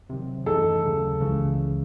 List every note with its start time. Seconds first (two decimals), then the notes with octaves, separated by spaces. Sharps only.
0.10 C3 D#3 F#3
0.46 F#2 E3 A3 D#4 A4
0.83 D#2 C#3 F#3
1.20 C#2 C#3 E3